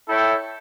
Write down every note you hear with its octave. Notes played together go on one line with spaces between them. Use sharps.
E4 A4 C#5 E5 G5